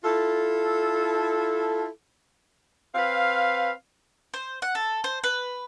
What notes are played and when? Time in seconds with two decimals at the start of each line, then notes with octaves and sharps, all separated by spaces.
0.05 E4 F4 A4
2.95 C4 B4 F5
4.34 C5
4.62 F#5
4.75 A4
5.04 C5
5.24 B4